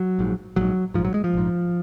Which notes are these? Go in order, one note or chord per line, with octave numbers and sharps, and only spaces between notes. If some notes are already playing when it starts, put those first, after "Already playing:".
Already playing: F#3
A#1 G#2
A#1 G#2 F#3
A#1 G#2 F3
F#3
G#3
F3
A#1 G#2